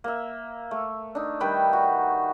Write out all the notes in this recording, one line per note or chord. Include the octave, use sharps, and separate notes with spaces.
A#3 E5
A3
D4 D#4
D#3 G3 B4 G5
F#4